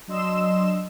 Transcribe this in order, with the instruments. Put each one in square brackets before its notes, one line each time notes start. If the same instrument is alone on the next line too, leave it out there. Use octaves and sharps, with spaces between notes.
[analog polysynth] F#3 D4 D#5 C6 E6 E7